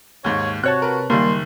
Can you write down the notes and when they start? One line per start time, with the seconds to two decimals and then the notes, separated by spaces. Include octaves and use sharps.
0.24 D#2 G#2 C#5
0.64 C3 F#4 C#5 A5 F#6
0.82 A#4 B4
1.10 F#1 D#3 G3 A#3 C6